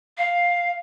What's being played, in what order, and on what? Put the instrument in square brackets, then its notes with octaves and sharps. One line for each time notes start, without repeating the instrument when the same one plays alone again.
[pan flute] F5